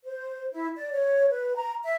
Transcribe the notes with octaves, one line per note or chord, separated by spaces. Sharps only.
C5
E4
D5
C#5
B4
A#5
E5